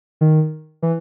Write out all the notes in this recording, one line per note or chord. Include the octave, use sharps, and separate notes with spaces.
D#3
E3